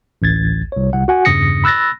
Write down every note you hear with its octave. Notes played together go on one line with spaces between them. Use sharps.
A1 D2 G#6 A6
C2 C#5
C2 F#5
F#4 F#5 G#5
E2 G2 C#3 D#6 A#6 C#7
B5 E6 F#6 A6 A#6